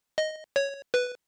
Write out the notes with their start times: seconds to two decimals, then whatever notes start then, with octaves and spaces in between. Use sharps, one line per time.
0.18 D#5
0.56 C#5
0.94 B4